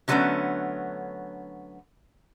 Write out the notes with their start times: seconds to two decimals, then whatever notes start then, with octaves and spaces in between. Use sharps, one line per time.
0.08 D3 F#3 G3 A3 B3 C#4